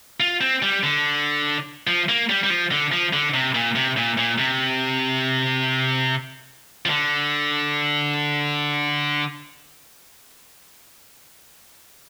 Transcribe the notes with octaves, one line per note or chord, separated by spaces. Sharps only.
F4
C4
G3
D3
F3
A#3
G3
G3
F3
D3
F3
D3
C3
A#2
C3
A#2
A#2
C3
F3
D3